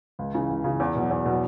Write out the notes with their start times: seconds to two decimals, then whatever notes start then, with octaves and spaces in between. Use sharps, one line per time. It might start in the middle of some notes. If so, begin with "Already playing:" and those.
0.19 C#2
0.34 C#3 E3
0.49 C#2
0.64 C#3 E3
0.80 E2
0.96 B2 F#3
1.11 E2
1.26 B2 F#3